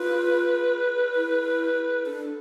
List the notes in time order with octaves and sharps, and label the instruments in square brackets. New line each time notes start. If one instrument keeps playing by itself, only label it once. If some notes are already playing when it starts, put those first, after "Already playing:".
Already playing: [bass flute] F4 [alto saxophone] B4
[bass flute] E4
[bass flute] D4 [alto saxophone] A4